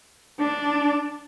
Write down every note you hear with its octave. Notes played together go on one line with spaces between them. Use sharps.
D4